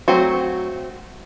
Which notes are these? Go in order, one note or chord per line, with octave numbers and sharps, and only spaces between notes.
F#3 A3 C4 F#4